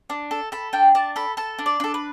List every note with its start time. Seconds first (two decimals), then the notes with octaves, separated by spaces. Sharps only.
0.10 D4
0.31 A4
0.52 A4 B5
0.73 D4 G5
0.95 D4 A5
1.16 A4 B5
1.37 A4 A5
1.59 D4
1.66 D5
1.80 D4 A4
1.94 B4